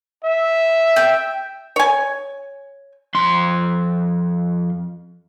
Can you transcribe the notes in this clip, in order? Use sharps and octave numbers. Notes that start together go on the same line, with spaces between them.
E5
G5
C#5 G#5
F2 C6